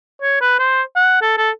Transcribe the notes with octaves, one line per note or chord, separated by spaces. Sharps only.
C#5
B4
C5
F#5
A4
A4